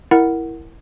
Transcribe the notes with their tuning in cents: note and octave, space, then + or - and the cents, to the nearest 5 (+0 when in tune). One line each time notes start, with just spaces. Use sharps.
E4 +0 A#4 +0 F#5 +0